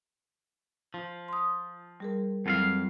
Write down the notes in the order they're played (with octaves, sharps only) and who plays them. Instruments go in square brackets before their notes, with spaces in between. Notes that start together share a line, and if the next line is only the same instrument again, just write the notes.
[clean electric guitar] F3
[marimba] C6 D#6
G3 G#4 A#4
[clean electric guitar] F2 F4 F5 [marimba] F#3 G3 E4